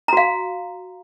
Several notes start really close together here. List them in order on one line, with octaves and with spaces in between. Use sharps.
A#5 F#4 F5